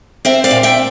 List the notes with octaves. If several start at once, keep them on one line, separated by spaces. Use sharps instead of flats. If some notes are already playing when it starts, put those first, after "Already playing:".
C4 C5 E5
D5 F5
A#2
E5 G5